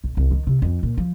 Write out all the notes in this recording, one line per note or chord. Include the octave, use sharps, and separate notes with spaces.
B1
C2
D#3
C3
F2
A#2
F3